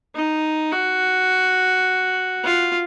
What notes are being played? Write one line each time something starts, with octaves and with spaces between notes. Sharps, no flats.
D#4
F#4
F4